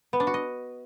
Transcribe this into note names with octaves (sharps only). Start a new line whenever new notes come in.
B3
D4
F#4
D#5